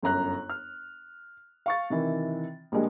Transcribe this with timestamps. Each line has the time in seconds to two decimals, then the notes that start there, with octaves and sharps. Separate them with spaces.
0.02 G1 F#2 A#5 F#6
0.50 F6
1.66 F5 C#6 A6
1.90 C3 D#3 E3
2.72 A#1 A#2 G3 G#3 D4